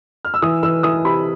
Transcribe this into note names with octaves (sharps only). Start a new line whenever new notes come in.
F6
E6
E3 D#6
E3 E6
E3 D#6
C3 B5